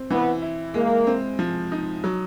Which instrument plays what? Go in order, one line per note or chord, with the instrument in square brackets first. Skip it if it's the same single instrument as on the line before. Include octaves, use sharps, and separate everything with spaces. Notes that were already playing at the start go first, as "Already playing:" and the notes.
Already playing: [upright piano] C4
[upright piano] E3 [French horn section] B3
[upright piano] E4
[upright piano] G#3 [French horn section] A#3
[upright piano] C4
F3
D#4
F#3